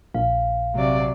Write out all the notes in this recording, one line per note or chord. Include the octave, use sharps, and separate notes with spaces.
A#1 F5
C3 F#3 D5